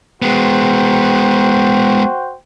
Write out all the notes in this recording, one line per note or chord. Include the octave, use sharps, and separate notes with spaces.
G#3 B3 F#4 C5 G5